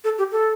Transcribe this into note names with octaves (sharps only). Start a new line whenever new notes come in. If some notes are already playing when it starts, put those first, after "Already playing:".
A4
G4
A4